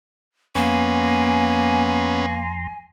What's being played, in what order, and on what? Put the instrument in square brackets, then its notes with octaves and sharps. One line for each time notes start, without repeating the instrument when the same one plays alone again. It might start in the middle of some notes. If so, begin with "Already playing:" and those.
[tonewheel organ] F2 A#5 C6 [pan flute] A#3 [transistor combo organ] B3 C#4 [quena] G#5